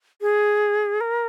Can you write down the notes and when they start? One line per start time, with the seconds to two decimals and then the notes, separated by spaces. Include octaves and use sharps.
0.21 G#4
1.01 A#4